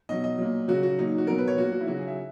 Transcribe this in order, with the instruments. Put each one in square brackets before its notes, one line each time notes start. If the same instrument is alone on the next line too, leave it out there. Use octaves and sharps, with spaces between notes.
[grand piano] B2 F#3 D#5
D#5
A#2 F#3
C#3 F#3 F#4
F#4
A#2 F#3 D#4
F#4
B2 F#3 A#4
B4
C#5
A#2 F#3 F#4
F#4
E4
C#3 F#3 F#4
G#4
E5